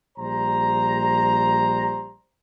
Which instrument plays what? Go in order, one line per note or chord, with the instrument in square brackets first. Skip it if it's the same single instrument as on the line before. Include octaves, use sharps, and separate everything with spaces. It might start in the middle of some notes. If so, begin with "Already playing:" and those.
[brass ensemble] A#1 G3 C5 A#5